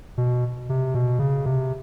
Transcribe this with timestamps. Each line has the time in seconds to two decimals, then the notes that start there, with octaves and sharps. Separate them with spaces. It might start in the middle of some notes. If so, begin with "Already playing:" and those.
0.18 B2
0.69 C3
0.94 B2
1.19 C#3
1.46 C3